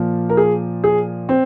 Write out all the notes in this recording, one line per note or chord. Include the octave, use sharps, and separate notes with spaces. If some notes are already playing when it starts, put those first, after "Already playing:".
Already playing: A#2 F3
A#4
G#4
G#4
C4